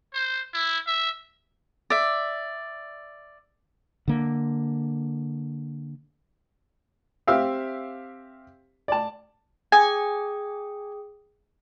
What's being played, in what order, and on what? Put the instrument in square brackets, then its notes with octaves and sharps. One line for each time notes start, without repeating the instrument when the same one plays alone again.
[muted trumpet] C5
E4
E5
[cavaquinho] D5 E5
[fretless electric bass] D3 A#3
[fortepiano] C4 G4 E5 F5
D5 A5
[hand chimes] G#4 G5 D#6 [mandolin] G#5